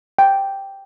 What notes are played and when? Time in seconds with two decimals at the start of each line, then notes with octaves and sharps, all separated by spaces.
0.19 G5